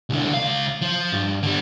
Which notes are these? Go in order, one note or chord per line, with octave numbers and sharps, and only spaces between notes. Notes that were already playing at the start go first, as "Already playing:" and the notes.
C2 D3
C#2 F5
F3
G2
D3 G3